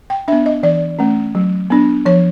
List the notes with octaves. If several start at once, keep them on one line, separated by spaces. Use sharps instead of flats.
G5
B3 D4 E5
D#5
E3 D5
A3 C#4
F#3
B3 D4
F3 C#5